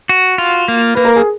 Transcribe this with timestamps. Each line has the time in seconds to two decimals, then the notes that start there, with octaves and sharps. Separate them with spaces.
0.09 F#4
0.38 F4
0.68 A#3
0.95 A#3 B4
1.05 A#4
1.16 G#4